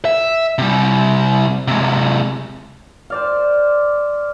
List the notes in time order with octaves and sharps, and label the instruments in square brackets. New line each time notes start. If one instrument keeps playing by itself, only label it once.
[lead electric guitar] E5
C3 G3
C3 G#3
[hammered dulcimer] C5 D5 F5